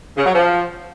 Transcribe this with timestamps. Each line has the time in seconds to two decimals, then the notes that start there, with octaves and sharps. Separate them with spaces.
0.17 C#3
0.26 F#3
0.34 F3